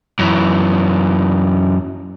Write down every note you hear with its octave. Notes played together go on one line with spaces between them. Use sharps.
F#2 E3